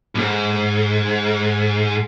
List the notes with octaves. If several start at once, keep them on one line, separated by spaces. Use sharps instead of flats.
B1 G#2